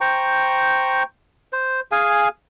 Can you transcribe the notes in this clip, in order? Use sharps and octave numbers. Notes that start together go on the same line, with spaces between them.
C5 G5 A#5 C#6
C5
G#4 F5 G#5